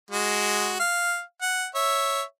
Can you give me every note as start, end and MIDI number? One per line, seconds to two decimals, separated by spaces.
0.11 0.79 56
0.11 0.79 66
0.79 1.22 77
1.42 1.66 78
1.75 2.22 73
1.75 2.22 76